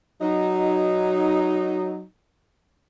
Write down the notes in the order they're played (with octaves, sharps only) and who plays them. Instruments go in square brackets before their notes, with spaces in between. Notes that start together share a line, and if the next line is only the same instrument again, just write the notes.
[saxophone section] F#3 D#4